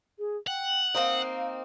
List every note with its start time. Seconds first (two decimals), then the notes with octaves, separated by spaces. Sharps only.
0.19 G#4
0.47 F#5 G5
0.94 A#3 C4 D#4 F5